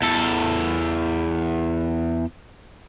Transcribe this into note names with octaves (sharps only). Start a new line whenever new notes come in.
E2 A4